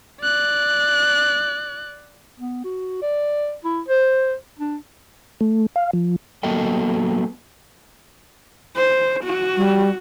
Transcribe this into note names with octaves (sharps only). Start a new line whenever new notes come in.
D5 F#6
B3
F#4
D5
E4
C5
D4
A3
F5
F3
F#3 A#3 B3 A4 D#5 G5
C5
F#4
G3